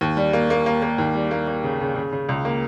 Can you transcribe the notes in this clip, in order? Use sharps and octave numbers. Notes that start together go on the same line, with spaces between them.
D#2
G3
A#3
A#3
A#3
A#3
D#2
G3
A#3
A#3
C#3
C#3
C#3
C#3
C#2
A#3